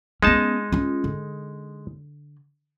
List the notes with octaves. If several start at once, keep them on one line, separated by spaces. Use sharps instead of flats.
G#3 B3 C#4 D#4 A5
C#4 F4
D3